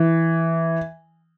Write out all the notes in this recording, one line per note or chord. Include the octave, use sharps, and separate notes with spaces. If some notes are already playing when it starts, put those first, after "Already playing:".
Already playing: E3